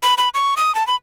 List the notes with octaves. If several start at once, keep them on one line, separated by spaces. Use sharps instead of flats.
B5
B5
C#6
D#6
A5
B5